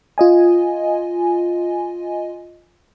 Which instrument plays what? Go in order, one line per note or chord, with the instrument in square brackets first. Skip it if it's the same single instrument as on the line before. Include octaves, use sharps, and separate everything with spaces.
[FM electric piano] F4 D#5 G#5